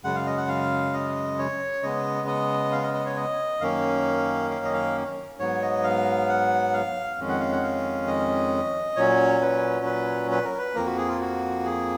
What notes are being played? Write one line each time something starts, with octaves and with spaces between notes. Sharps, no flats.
F#2 C#3 G#3 F#5
F5
D#5
F#5
F5
D#5
C#5
C#3 G#3 B3 D#5
D#5
F5
D#5
D#5
C#5
D#5
F#2 D#3 A#3 C#4 F5
F5
D#5
F5
G#2 F#3 B3 C#5
D#5
F5
F#5
F5
F2 D#3 G#3 C#4
F#5
F5
F#5
F5
D#5
A#2 F#3 C#4 C#5
B4
B4
B4
A#4
B4
F2 F3 A#3 A#4
F#4
G#4
F4
F#4
G#4